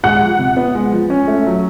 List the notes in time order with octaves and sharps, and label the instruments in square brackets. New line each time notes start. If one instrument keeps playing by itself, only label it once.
[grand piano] G#3 [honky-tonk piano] F#5
[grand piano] F3
C3
B3
G#3
F3
C#4
A3
F#3